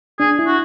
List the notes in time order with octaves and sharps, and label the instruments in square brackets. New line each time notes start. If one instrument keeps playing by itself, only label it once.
[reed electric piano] D4 [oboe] G#4
[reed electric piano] E4
[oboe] F#4